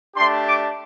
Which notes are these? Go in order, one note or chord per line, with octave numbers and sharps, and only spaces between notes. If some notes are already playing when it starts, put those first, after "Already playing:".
A3 D4 G4 C6
D6